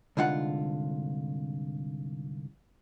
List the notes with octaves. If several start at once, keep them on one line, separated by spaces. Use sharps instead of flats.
C2 G#2 D3 F4 F#5